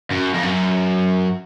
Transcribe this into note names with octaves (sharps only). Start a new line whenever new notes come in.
F#2
F2
F#2